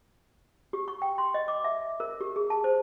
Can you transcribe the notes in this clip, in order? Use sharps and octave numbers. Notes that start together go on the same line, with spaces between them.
G4
C#6
G5
C6
D#5
D6
E5
A#4
G4
G#4
A5
C5